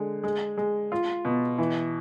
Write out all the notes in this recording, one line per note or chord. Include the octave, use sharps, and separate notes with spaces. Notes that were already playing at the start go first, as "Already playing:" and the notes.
Already playing: D3 G#3
G#3
G#3
F4
B2
E3